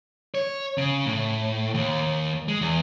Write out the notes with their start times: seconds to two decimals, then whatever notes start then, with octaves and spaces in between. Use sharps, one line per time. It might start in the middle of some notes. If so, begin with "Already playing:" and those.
0.35 C#5
0.78 C#3
1.07 A2
1.74 D#2
2.48 G#3
2.61 E2